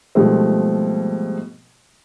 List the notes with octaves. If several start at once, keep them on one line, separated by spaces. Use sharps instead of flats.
G#2 B2 F3 G3 A3 C4